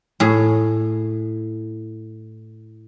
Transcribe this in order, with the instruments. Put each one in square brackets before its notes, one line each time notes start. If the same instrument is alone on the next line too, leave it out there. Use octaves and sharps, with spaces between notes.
[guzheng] A2 G#4